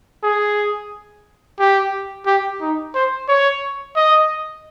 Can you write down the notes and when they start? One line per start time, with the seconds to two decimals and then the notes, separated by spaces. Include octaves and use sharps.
0.23 G#4
1.60 G4
2.26 G4
2.61 D#4
2.95 C5
3.28 C#5
3.96 D#5